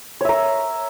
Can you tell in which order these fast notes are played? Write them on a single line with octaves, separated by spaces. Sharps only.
C#5 E5 A#4